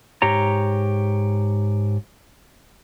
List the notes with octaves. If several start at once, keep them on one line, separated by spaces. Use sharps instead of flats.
G#2 G4 C#5 A#5